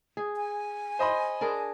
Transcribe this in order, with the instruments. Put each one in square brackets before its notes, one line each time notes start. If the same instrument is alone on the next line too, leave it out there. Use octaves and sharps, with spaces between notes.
[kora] G#4
[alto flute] G#5
[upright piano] C5 D#5 B5
[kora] D4 G#4 A#4